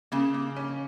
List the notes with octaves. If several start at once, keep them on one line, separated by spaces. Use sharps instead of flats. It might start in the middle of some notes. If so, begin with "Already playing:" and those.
C#3 A#3
A#3
C#4